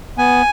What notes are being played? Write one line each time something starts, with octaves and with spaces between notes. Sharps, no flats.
B3 G#5